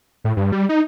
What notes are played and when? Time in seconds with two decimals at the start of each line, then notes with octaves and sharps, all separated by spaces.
0.24 A2
0.37 G2
0.52 G3
0.69 D#4